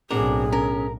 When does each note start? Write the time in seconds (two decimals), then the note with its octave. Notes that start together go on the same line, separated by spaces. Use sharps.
0.11 B1 A2 C4 D4 F#4 G#4 A#4
0.52 C#4 A#4